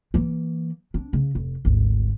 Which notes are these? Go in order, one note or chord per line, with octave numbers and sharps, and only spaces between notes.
E3 A#3
C4 D4
C#3
F1
G#1 D2